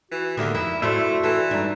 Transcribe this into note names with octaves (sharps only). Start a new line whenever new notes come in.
E3 F#4
D#2 D3 A#3 B3 E5
F2 E4
A3 D4 E4 F#4 C5 E5 C6
E3 A4
G2 D4 D#4